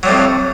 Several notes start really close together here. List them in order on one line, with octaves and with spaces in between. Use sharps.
F#3 G3 A2 F2